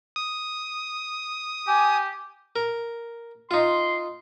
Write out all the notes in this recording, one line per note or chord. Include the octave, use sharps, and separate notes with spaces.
D#6
G4 G#5
A#4
D#4 F4 C6